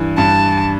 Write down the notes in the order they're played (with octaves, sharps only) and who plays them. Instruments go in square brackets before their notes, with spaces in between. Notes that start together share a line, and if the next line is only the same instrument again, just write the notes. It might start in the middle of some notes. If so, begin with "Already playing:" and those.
Already playing: [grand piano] G2 E3
[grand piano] G2 [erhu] A5